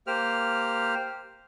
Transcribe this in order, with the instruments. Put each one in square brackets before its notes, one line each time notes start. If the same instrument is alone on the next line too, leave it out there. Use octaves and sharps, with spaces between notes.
[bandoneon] A#3 G4 C5 F6